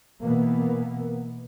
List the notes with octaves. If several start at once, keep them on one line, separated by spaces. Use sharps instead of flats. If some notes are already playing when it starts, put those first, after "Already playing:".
B2 E3 A#3 B3